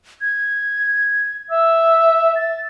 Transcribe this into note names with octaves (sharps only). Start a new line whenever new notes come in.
G#6
E5 E6
A6